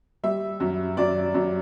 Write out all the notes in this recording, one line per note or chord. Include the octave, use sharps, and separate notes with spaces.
G3 E5
F#2
F#2 D5
F#2